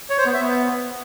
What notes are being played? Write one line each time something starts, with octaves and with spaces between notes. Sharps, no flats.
C#5
C5
B3
E5
B3